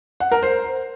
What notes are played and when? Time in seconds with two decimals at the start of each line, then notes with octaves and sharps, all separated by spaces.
0.20 F#5
0.32 A#4
0.43 C5